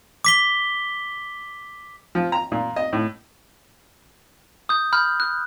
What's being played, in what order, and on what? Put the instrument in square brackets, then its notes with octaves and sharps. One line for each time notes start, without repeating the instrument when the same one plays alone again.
[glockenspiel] D6 B6 G7
[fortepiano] F3
A#5
A#2
D#5
A2
[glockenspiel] D#6 G6
B5 F6 G6
F#6